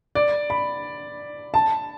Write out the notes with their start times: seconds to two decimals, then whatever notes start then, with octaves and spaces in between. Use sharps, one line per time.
0.15 D5
0.50 B5
1.54 A5